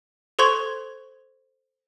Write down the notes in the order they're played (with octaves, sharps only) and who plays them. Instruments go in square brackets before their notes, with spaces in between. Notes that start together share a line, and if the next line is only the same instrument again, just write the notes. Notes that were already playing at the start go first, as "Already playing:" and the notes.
[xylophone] A4 C5 C6 C#6 G#6